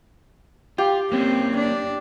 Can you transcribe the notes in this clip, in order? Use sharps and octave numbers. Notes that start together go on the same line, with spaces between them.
F4 G4
A#3 C4 C#4
D4